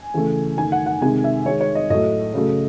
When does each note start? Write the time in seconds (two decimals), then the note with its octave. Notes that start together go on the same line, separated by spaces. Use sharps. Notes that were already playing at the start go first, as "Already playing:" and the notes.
Already playing: G#5
0.14 C#3 E3 A3
0.57 D#3 A3 G#5
0.72 F#5
0.86 F#5
1.02 C3 D#3 G#3 G#5
1.24 E5
1.45 D#3 G#3 C#5
1.61 C#5
1.75 D#5
1.90 A2 F#3 A3 D#5
2.34 C#3 F#3 A3